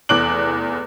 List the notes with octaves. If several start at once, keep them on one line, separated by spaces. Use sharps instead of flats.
F1 E2 D6 F#6 D7 F#7